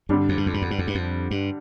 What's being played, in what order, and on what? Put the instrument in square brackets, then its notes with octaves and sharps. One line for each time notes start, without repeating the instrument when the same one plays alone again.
[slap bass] G2 [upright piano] D3 G3 D4
[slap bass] F2
G2
F2
G2
F2
G2
F2
G2
F2
G2